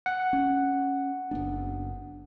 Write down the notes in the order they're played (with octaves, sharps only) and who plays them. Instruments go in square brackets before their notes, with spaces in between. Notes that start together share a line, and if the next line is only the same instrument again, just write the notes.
[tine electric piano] F#5
[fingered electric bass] C#4
F#1 B3 D4